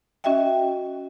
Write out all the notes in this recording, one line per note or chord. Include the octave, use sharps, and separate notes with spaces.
C#4 F#4 D#5 E5 G5